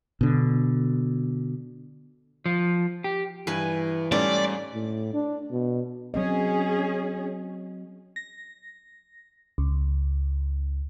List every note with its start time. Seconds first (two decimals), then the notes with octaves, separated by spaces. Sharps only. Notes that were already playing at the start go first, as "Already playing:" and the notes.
0.21 B2 D3
2.46 F3
3.04 G4
3.47 G2 E3 B4 G#5
4.12 G#2 G3 A3 C#4 D5
4.74 A2
5.13 D4
5.51 B2
6.14 F#3 C4 C#4 G#4 D#5
8.16 A#6
9.58 C#2